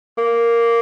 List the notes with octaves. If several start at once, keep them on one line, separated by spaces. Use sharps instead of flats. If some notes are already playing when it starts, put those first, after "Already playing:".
A#3